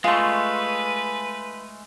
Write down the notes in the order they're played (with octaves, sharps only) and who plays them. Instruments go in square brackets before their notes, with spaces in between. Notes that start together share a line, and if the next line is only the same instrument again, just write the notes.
[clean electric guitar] G#3 A3 [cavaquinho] F4 C#6 [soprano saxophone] B4